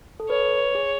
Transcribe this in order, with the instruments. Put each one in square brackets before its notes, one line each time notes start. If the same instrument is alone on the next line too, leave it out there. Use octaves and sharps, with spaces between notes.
[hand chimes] A4
[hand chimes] B4 [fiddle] C#5
[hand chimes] G#4